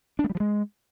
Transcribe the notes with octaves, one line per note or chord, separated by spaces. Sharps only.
D4
A3
G3
F3
G#3